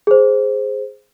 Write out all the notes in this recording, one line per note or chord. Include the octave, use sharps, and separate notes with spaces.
G#4 C5